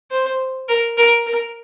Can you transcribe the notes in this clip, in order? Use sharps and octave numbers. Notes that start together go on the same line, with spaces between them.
C5
A#4
A#4
A#4